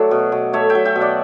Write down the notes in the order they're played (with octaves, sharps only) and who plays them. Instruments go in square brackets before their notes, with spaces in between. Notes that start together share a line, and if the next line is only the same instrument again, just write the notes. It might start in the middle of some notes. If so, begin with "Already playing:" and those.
Already playing: [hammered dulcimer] F#3 A3 D5 F#5
B2
B2
A3 C#5 E5
E5 G5
F#3
E5 G5
B2
D5 F#5